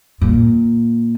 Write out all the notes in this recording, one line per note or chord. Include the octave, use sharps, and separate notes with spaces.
A#2